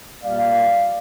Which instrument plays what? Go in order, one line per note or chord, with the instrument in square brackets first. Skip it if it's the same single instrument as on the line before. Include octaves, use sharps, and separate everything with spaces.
[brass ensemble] A#2 G3 A#3 D5 F5